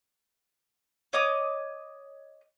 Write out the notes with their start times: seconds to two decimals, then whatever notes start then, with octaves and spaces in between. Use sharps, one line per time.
1.13 C#5 D#5 D6 D#6